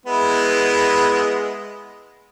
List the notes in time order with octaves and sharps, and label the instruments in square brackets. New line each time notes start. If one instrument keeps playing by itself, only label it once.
[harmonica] G#3 B3 E4